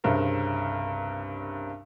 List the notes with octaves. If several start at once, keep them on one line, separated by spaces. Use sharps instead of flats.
C2 G2 C#3 C4 A#4 E5